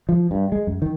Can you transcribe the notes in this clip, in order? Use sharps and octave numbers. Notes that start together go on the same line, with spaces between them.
F3
G2
G#3
F#2
D#3